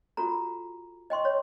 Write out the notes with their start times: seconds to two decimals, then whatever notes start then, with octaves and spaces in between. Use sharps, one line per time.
0.17 F4 F#4 A4 A#5
1.10 D#5 G5 C6 C#6
1.25 C#5